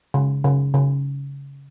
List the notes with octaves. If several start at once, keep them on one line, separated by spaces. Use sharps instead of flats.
C#3
C#3
C#3